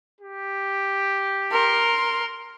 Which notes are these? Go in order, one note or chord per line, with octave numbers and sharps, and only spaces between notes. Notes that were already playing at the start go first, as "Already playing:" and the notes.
G4
A#4 C6